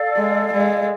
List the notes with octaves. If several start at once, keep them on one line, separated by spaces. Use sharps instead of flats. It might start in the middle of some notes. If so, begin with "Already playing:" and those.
Already playing: A4 D5 F5
G#3
G#3